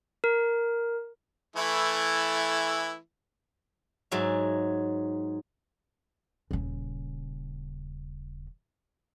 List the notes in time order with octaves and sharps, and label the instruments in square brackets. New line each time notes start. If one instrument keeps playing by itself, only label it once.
[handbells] A#4
[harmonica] E3 A3 E4
[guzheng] G#2 F#3 E5
[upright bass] D#1 C#3